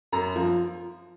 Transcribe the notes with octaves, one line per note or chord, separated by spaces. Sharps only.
F#2 A#5
F3